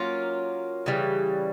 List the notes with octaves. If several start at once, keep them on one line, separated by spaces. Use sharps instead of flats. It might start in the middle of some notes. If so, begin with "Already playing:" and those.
Already playing: F#3 A#3 C#4 F4
C#3 E3 G3